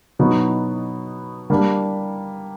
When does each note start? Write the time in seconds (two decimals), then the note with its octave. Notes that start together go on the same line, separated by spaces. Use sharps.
0.19 B2 F#3 B3 D#4 F#4
1.50 G3 A#3 D4